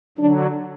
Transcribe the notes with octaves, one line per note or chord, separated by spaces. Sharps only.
D3 F#3 D4